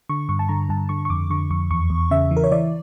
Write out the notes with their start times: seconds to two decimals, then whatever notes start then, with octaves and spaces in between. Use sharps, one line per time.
0.09 D3 C#6
0.29 G2 C#6
0.39 A5
0.49 D3 A#5
0.69 G2 A5
0.89 D3 C#6
1.05 C#6
1.09 F2 D6
1.30 D3 C#6
1.50 F2 C#6
1.71 E2 C#6
1.90 E2
2.11 C#3 E5
2.31 E3
2.37 A#4
2.44 C#5
2.51 E3 D5